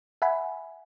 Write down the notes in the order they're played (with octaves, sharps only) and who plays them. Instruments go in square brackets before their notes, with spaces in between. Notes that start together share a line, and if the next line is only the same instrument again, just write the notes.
[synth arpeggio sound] E5 F#5 G#5 B5